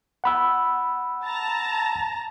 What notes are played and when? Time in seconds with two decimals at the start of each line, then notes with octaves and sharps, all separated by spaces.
0.24 F#5 B5 E6
1.24 A5 A#5